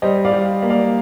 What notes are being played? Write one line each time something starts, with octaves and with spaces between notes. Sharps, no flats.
G3 C5 D#5
D5 F5
G3
A#3
D5 F5